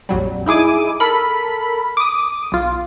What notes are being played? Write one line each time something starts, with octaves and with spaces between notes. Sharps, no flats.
A#1 F2 F#3 G3
D#4 E4 G#4 D6 D#7
A4 A#4 B5
D6 D#6
B1 F4